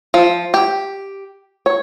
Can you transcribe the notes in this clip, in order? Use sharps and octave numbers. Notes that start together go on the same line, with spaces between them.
F3
G4
C#5